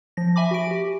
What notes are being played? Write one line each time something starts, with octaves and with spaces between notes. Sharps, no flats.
F3 A#6
E5 G#5 B5 D6
F#4 D7
G4